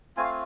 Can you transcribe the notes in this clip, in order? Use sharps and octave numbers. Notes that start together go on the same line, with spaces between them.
A3 C4 F4 G#5
F5